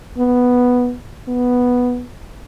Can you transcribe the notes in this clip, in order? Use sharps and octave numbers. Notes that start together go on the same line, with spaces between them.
B3
B3